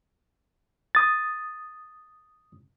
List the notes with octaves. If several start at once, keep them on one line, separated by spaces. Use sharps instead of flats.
D#6 A6